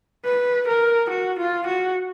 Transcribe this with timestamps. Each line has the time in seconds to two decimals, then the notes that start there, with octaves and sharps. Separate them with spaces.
0.25 B4
0.68 A#4
1.10 F#4
1.39 F4
1.66 F#4